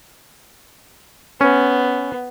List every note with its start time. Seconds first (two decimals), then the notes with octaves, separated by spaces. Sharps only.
1.41 B3 C#4